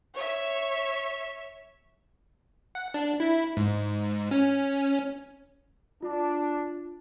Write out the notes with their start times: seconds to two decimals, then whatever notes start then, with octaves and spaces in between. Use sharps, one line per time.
0.14 C#5 E5
2.75 F#5
2.94 D4
3.20 E4
3.57 G#2
4.31 C#4
6.03 D4 F4